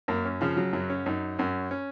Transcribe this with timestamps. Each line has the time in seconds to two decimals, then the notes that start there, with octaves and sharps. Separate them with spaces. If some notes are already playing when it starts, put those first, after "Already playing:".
0.08 F#2 A#3
0.25 C#4
0.41 C#3 F3
0.57 F#3
0.73 F#2 F#3
0.90 C#4
1.06 F#2 D#4
1.39 F#2 C#4
1.71 C#4